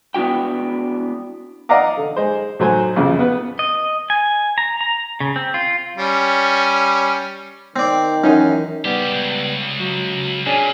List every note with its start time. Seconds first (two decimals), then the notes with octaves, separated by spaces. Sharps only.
0.14 B3 D4 E4 F#4 G5
1.69 D5 D#5 F5 F#5 A#5 D6
1.97 D3
2.16 G#3 C5
2.59 A2 F#3 C5 G#5
2.96 A#1 F2 C#3
3.19 B3 B4
3.59 D#5
4.10 G#5
4.58 A#5
4.81 A#5
5.20 C#3
5.36 C4
5.54 F4
5.96 G3 C#4
7.76 D#3 C4 D5
8.24 F#2 E3 C#4 D#4
8.85 C#2 G3 B3 G4
9.13 C#2
9.80 F#3
10.46 A#2 C#4 D4 G#4